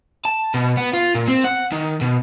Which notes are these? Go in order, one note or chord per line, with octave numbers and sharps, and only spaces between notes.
A5
B2
B3
F4
A#2
C4
F#5
D#3
B2